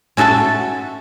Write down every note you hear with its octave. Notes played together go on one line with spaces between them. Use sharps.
C#4 F#4 A4 E5 A5